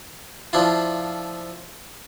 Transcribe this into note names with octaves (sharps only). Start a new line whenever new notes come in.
F3 D4 E4 F4